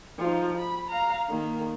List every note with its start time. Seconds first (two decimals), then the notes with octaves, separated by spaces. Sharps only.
0.20 F3 D#4
0.57 B5
0.90 F5 A#5
1.30 D#3 A#3